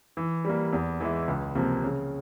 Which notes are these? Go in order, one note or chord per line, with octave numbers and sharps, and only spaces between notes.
E3
G3 A#3
E2
E3 G#3 E4
C#2
C3 F3 A#3
C#3